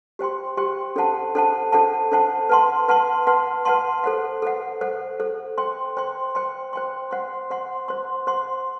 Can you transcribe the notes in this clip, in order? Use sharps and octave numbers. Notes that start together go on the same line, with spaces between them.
G4 C5 G5 C6
G4 C5 G5 C6
D4 A4 C5 F#5 A5
D4 A4 C5 F#5 A5
D4 A4 C5 F#5 A5
D4 A4 C5 F#5 A5
B4 F#5 A5 C6
B4 F#5 A5 C6
B4 F#5 A5 C6
B4 F#5 A5 C6
A4 C5 F#5
A4 C5 F#5
A4 C5 F#5
A4 C5 F#5
C5 G5 C6
C5 G5 C6
C5 G5 C6
C5 G5 C6
C5 F#5 C6
C5 F#5 C6
C5 F#5 C6
C5 F#5 C6